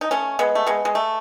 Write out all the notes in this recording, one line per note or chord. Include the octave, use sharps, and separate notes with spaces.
D#4
A3 C#4
G#3 B3
A3
G#3 B3
G#3
A3